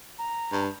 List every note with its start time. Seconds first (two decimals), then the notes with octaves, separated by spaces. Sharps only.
0.19 A#5
0.52 G2